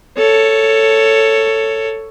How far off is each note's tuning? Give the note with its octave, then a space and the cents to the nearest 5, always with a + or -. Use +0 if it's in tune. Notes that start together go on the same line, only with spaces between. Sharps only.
A4 +10 C#5 +5